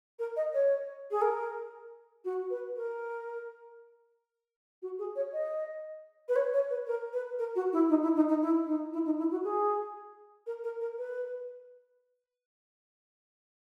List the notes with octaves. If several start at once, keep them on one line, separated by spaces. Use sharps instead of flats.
A#4
D#5
C#5
G#4
A#4
F#4
B4
A#4
F#4
G#4
C#5
D#5
B4
C#5
C#5
B4
A#4
B4
A#4
F#4
E4
D#4
E4
D#4
D#4
E4
D#4
E4
D#4
E4
F#4
G#4
A#4
A#4
A#4
B4